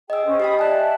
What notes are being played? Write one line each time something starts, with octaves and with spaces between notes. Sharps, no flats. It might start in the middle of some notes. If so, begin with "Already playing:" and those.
G#4 D#5 G5 E6
C#4 C5
G4 D#5 G5 B5 D#6
D5 E5 G#5 A5 F#6